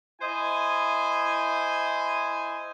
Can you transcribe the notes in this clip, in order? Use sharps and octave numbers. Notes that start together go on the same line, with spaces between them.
E4 C5 D#5 G#5